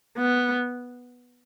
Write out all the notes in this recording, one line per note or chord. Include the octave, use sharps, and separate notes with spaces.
B3